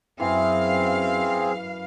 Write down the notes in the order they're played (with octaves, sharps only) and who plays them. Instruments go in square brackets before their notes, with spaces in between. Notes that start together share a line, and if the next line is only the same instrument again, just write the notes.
[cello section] F#2 F5 [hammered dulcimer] E3 [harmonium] C4 G#4